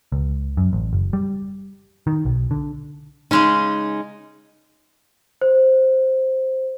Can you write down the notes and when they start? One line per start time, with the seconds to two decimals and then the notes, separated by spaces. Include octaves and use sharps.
0.12 C#2
0.57 F#2
0.73 A1
0.93 F#1
1.13 G3
2.07 D#3
2.25 B1
2.51 D3
3.31 C#3 G#3 C#4 D#4
5.41 C5